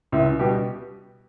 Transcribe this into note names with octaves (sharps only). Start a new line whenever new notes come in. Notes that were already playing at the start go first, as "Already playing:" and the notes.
C#2 E4
B2 G3 G4